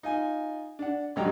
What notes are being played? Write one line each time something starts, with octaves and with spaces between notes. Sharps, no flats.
D#4 F4 G#5
D4 F#5
G#1 D2 F#3 G3 G5 A#5